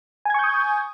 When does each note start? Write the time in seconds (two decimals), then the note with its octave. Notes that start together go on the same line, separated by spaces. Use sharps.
0.25 G#5
0.30 G#6
0.34 C#6
0.39 G6
0.43 D#6